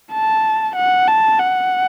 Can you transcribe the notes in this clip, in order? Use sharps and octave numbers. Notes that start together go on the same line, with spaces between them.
A5
F#5
A5
F#5